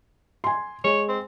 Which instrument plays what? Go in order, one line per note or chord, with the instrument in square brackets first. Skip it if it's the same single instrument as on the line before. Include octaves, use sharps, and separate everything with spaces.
[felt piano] G#5 C6
[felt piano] G#3 [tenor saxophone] C#5
[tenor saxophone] C4